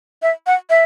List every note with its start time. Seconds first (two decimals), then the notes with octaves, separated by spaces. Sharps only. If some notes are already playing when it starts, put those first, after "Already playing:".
0.22 E5
0.47 F#5
0.70 E5